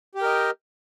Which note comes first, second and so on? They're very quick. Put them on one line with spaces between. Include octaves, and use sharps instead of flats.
G4 G5 A#4 D#5